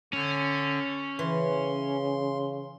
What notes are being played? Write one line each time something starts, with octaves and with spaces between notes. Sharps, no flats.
D3 C#4
C#3 E3 C6